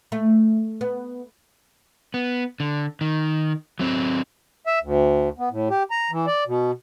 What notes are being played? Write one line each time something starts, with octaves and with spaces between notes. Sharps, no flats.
A3
B3
B3
D3
D#3
F#3 C4
E5
D2
B3
A2
G4
A#5
E3
D5
B2